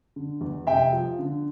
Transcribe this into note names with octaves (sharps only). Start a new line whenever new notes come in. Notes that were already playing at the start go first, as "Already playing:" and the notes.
D3
E2
F1 E5 G5
F3
D3